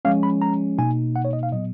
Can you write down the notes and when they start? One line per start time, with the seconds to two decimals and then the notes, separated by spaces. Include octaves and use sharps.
0.05 F3 G#3 C#4 F5
0.23 B5
0.42 A#5
0.78 B2 A#3 D#4 G#5
1.16 F#5
1.25 C#5
1.33 D#5
1.43 F5
1.52 A#2 F#3 B3 D#5